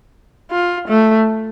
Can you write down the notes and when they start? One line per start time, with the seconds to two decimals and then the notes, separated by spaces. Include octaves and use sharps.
0.52 F4
0.88 A3